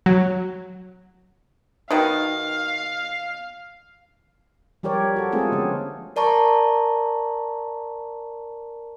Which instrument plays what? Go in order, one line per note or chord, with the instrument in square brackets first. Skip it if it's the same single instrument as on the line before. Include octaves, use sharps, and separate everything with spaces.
[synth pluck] F#3
[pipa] B2 D#3 [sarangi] F5
[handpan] F3 G3 G4 A#4 C#5 D5
F#4 A4
G#3 A3 C4 F4 G#4 A4
D3 F3 B3 C#4
[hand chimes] A#4 D5 A5 A#5 C#6